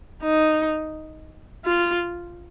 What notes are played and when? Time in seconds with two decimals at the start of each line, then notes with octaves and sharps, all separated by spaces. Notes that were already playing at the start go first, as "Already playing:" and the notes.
0.22 D#4
1.65 F4